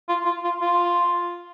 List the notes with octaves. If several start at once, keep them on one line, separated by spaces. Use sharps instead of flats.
F4
F4
F4
F4